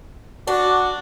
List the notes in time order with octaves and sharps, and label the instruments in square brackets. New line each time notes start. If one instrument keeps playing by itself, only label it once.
[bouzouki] D4 [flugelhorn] F#4